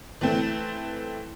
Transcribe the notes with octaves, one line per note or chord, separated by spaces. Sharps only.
E3 A3 C4